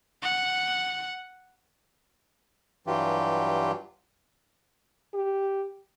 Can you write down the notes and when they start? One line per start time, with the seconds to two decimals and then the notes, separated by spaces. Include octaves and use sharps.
0.22 F#5
2.87 G2 E3 F#3 F4 G4
5.14 G4